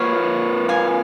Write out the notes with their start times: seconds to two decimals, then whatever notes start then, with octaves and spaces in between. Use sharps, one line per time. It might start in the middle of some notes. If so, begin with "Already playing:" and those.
Already playing: A#3 F4 B4 C#5 F5
0.69 F5 G#5